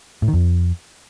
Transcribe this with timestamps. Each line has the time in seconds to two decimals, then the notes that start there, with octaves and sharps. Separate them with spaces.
0.22 A2
0.28 D#3
0.34 F2